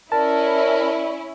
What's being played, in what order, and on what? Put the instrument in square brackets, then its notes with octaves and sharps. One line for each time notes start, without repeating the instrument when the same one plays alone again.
[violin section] C#4 E4 [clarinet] A#4 [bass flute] D5 [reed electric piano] A5